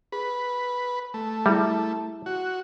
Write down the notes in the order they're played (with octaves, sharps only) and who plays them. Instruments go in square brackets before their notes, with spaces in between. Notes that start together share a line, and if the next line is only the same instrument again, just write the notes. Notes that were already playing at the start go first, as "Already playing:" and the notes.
[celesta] G#4 [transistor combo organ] B4
[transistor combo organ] A3
[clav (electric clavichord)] G3 [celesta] E4 G#4 E5
[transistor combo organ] F#4